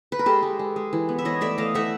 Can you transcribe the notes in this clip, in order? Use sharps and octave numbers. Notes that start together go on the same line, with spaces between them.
B4
A#4
G#3 G4 A4
G#3
G#3
G#3
E3
B3
E5
E3 C#5 D#5
A3 D5 E5
A3 D#5 F5
A3 E5 F#5